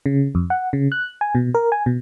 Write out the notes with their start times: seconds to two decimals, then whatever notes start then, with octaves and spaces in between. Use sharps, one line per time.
0.06 C#3
0.35 F2
0.50 F#5
0.73 C#3
0.92 F#6
1.21 G#5
1.35 B2
1.54 A#4
1.72 G#5
1.86 B2